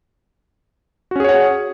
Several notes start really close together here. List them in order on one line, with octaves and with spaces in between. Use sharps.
F#4 C#4 G#4 C#5 F#5